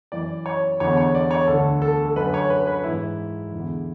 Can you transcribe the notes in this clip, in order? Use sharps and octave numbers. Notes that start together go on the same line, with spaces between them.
F#2 E3 D5
C#5
E2 D3 C#5
C#5
D5
C#5
D2 D3 A4
A4
A4
F#2 D3 B4
C#5
B4
B4
G#2 E3 E4
E2 D3